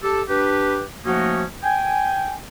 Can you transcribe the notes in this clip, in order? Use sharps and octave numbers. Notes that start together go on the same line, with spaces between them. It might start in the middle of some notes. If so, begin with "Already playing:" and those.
G4 A4 A5
D4 G4 B4
F3 A3 A#3 C#4 D#4 F#4
G5 G#5